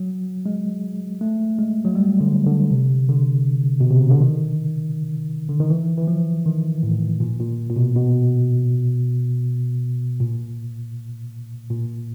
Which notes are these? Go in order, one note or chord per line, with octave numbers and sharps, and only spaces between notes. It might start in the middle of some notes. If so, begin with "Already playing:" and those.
Already playing: F#3
G#3
A3
G#3
F#3
G3
D3
D3
C3
D3
B2
C3
C#3
D3
D#3
D3
D#3
E3
E3
F3
D#3
A2
A#2
A#2
A#2
B2
B2
A#2
A#2